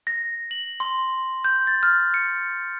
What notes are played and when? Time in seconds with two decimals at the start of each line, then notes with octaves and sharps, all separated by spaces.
0.07 A#6
0.51 F#7
0.80 C6
1.44 G6
1.67 A6
1.83 F6
2.14 C#7